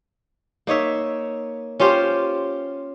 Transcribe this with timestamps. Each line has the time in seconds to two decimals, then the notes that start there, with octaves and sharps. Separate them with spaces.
0.67 A#3 D#4 C#5 E5
1.80 C#4 F4 G4 C5